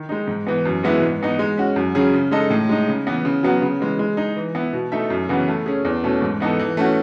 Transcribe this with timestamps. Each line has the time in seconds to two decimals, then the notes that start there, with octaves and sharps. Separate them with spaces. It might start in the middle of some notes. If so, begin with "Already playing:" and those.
Already playing: D#3
0.09 G#3 D#4
0.28 G#2
0.47 E3 B3
0.65 F#2
0.83 E3 G#3 B3 E4
1.02 G#2
1.21 E3 B3 D#4
1.39 G#3
1.58 C#4 F#4
1.76 F#2
1.95 C#3 F#3 C#4 G#4
2.14 C#3
2.31 G#3 D#4 A4 D#5
2.50 A2
2.69 G#3 D#4
2.88 C#3
3.06 E3 B3
3.25 C#3
3.43 F#3 B3 F#4
3.62 C#3
3.80 E3 G#3
3.99 G#3
4.17 D#4 G#4
4.36 E3
4.55 B3 E4
4.73 B2
4.92 A3 D#4 A4 E5
5.10 F#2
5.29 C#3 E3 B3 F#4
5.48 A3
5.66 C#4 G#4
5.85 E2
6.03 B2 A3 C#4
6.22 G#2
6.40 E3 B3 D#4 A4
6.59 E3
6.77 A3 C#4 F#4